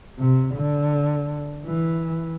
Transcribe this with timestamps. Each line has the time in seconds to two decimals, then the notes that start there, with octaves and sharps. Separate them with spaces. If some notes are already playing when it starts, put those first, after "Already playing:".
0.18 C3
0.55 D3
1.65 E3